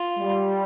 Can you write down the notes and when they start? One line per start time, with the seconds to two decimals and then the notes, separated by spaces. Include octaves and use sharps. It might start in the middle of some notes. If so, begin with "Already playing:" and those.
Already playing: F4
0.18 G3